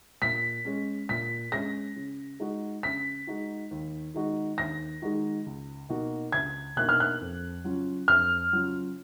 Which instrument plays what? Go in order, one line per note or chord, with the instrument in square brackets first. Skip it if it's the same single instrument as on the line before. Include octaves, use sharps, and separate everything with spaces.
[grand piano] A#2 [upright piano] B6
[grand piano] G#3 C#4
[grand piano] A#2 [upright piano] B6
[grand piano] G#3 C#4 [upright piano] A#6
[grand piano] C#3
G#3 D#4 F#4
[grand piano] C#3 [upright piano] B6
[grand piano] G#3 D#4 F#4
D#2
D#3 G#3 D#4 F#4
[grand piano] D#2 [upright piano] A#6
[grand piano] D#3 G#3 D#4 F#4
C#2
B2 A#3 D#4 F#4
[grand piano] C#2 [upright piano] G#6
[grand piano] B2 A#3 D#4 F#4 [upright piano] F#6
[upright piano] F6
F#6
[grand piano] F2
C#3 F#3 C#4 F4
[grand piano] F2 [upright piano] F6
[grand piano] C#3 F#3 C#4 F4